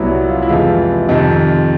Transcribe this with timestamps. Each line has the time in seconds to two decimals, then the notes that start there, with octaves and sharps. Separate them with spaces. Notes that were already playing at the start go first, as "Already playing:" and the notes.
Already playing: C2 A#2 F#3 B3 E4
0.08 F#4
0.29 F4
0.42 E4
0.48 F2 C3 E3 G#3 F4
1.09 F2 C3 D#3